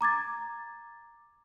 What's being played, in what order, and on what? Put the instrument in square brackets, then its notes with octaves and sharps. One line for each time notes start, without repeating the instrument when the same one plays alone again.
[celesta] A#5 D6 G#6 A6